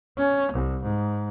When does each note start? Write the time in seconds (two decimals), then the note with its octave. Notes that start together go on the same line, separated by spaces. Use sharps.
0.18 C#4
0.52 C2
0.83 G#2